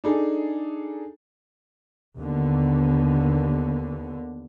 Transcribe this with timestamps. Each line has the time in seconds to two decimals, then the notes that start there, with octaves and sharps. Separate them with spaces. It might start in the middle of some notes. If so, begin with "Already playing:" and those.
0.04 D4 D#4 G#4 A4
2.17 D#2 D3 B3